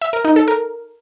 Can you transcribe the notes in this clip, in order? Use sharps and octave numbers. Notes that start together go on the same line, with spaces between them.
E5
A#4
D#4
A4
A#4